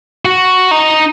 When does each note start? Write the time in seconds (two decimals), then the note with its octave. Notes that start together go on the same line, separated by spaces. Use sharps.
0.25 F#4
0.71 D#4